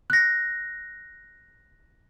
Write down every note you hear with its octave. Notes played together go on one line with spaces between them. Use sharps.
F#6 A#6